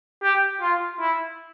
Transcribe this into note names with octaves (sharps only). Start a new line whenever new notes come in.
G4
F4
E4